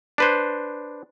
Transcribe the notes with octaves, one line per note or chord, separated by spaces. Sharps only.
D4 B4 C5